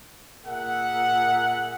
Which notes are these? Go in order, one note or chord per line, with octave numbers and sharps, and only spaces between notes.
A#2 G#4 A#4 E5 F#5